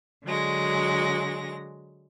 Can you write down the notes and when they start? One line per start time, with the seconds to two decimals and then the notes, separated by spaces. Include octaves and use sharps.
0.24 D3 F#3 G#3 A#6